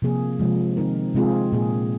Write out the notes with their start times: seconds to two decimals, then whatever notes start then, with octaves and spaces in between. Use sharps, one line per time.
0.02 C3 F3 A#3 G#4
0.39 C3 F3 G#3
0.77 D#3 C4 D#4 A#4
1.15 C3 G#3 C4 F4 G#4
1.52 A#2 A#3 G#4